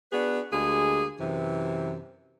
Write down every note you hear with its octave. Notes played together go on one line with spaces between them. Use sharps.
B3 D4 F#4 G#4 B4
D2 G#3 A#3 G4 G#4
F#2 C3 E3